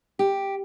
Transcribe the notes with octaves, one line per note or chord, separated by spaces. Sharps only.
G4